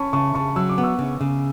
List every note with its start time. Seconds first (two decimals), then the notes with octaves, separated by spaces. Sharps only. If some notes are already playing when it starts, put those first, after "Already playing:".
Already playing: C#4 A5 B5 C#6
0.13 C#3 A5 C#6
0.35 C#3 A5 C#6
0.56 F#3 E6
0.69 D6
0.78 B3
0.83 C#6 E6
0.99 C#3
1.21 C#3